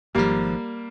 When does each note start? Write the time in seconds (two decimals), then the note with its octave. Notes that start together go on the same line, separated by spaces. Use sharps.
0.15 G#1 G#2 F3 G3 A#3